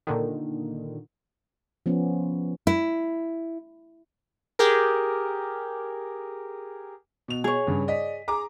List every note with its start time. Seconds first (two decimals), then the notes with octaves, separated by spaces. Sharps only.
0.07 A#2 D3 D#3
1.86 F3 B3 C#4
2.67 E4
4.59 G4 G#4 A#4
7.28 B2 F7
7.44 G#4 C#5
7.67 G2 C#3
7.88 D5 D#5 B6
8.28 G#4 A#5 D6